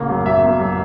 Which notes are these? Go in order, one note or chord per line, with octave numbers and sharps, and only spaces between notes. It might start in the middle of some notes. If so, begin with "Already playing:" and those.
Already playing: A1 C#3 A#3
F#2
F#2 E5
A#3
F#2